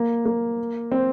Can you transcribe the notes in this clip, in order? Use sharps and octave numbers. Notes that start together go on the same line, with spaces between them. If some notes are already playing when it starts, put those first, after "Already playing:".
Already playing: A#3
A#3
C4